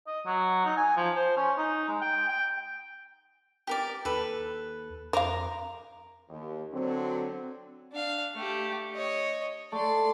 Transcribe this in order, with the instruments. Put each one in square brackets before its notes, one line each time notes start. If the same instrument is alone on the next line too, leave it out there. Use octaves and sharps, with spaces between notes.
[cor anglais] D#5
F#3
D#4
G#5
F3
C5
C#4
D#4
G#3
G5
G5
[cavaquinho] G4 A#4 D5
[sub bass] D#2 [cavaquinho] A4 B4
[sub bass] F2 [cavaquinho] A#4 A#5 D6 [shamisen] C5 F5
[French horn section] D#2
D3 F#3 C4
[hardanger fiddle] D4 F5
A3 G4
C#5 D#5
[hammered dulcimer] A3 [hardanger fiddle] D5 C6